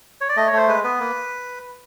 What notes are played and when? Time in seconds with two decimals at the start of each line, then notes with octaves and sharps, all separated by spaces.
0.21 C#5
0.29 D5
0.36 A3 D#5
0.47 C#5
0.52 A3 C5
0.67 G#3 B4
0.84 B3 B4
1.00 A#3